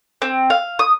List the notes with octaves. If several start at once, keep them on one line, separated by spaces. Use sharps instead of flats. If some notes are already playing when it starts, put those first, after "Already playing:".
C4
F5
D#6